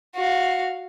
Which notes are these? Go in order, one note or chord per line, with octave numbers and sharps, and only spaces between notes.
F#4 F5